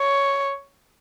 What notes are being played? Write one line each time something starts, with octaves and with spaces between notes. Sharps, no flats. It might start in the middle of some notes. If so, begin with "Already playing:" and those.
Already playing: C#5